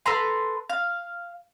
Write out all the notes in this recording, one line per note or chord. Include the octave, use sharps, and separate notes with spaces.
A4 B4 A#5 C6
F5